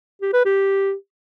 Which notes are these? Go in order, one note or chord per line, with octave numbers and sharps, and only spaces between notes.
G4
B4
G4